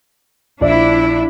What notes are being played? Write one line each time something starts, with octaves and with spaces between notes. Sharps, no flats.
A#1 D4 E4 D5 E5